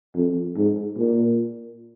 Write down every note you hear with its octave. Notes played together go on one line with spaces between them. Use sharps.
F2
G#2
A#2